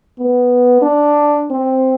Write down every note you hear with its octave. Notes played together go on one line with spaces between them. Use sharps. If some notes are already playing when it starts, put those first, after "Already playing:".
B3
D4
C4